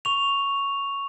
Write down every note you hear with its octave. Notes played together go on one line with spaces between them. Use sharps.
C#6 F7